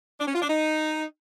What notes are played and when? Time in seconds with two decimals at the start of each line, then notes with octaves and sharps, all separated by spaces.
0.19 D4
0.27 C#4
0.34 F4
0.42 D4
0.49 D#4